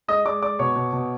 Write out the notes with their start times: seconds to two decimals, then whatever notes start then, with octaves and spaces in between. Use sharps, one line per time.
0.08 G#3 D#5 D#6
0.25 G#3 D5 D6
0.42 G#3 D5 D6
0.59 B2 C#5 C#6
0.76 B2
0.93 B2